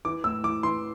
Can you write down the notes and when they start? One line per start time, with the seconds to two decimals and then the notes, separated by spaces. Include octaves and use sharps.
0.05 E3 D6
0.24 A2 E6
0.44 E3 D6
0.63 E3 C6